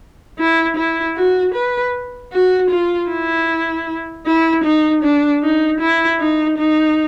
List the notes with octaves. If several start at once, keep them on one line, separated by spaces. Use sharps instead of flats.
E4
E4
F#4
B4
F#4
F4
E4
E4
D#4
D4
D#4
E4
D#4
D#4